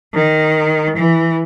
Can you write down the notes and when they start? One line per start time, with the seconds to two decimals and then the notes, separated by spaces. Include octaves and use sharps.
0.14 D#3
0.96 E3